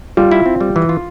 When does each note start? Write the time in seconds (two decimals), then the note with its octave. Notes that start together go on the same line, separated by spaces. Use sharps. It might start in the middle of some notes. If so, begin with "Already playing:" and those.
0.17 G3 F4
0.31 E4
0.46 C4
0.61 G3
0.76 E3
0.89 F4